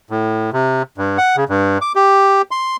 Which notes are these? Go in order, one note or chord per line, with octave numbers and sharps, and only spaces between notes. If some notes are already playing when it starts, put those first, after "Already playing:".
A2
C3
G2
F#5
C#3
G2
D6
G4
C6